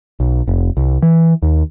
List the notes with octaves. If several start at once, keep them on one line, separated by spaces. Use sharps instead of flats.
B1
F1
C2
E3
D#2